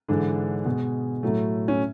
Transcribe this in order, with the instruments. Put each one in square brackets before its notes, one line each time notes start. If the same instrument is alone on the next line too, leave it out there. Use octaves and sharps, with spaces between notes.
[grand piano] G#2 D3 E3 G#3 D4
B2 G#3
A2 F#3 A3
C#4